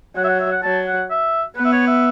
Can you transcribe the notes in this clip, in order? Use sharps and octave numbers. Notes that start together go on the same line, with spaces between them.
F#3 F#5
E5
F#5
E5
F#5
F#3 A5
F#5
E5
B3 B4
E5
C#5
E5